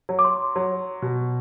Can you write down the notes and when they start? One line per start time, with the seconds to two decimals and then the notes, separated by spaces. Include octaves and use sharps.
0.09 F#3
0.19 D6
0.24 C6
0.56 F#3
1.02 B2